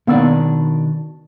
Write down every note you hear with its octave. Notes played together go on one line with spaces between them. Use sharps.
B2 D#3 A#3 B3 D4 E6